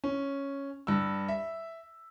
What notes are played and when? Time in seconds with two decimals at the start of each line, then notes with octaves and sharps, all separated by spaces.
0.04 C#4
0.87 G2 E6
1.28 E5